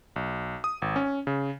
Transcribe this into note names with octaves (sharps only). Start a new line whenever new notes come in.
B1
D#6
G#1
C#4
C#3